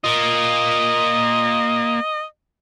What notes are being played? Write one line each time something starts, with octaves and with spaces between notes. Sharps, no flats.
A#3 F4 D#5